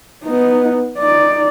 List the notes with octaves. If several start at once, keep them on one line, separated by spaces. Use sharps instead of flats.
B3 D#4
D#4 D5